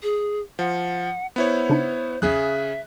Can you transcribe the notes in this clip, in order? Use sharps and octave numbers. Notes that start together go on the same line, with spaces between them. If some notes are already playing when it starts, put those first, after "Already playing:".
G#4
F3 F#5
B3 E4 C5 C#5
C#3 D4 D#4
B1 E2 C#3 G#4 E5 F#6